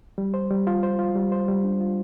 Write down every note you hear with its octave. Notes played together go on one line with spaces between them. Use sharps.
G3
C5
G3
F4
C5
F4
G3
C5
G3
D4
F4